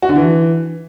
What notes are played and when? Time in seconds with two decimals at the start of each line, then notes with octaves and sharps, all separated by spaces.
0.02 F#4
0.09 D3
0.16 E3